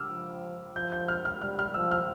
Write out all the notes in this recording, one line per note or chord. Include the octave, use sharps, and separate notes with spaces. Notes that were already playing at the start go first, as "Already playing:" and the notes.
Already playing: D6 E6 F6
F3
F3 G6
G6
F6
F6
G3 F6
F6
F3 E6
F6